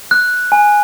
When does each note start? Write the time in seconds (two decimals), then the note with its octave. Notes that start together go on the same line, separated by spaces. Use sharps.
0.11 F#6
0.52 G#5